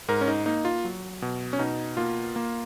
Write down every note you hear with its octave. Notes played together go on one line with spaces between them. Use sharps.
G#2 A#4
C#4
D#4
A#3 D#4
F4
F#3
B2
C#4
B2 D#4
A#3 F4
A#3